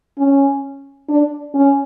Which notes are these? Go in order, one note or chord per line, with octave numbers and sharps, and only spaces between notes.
C#4
D4
C#4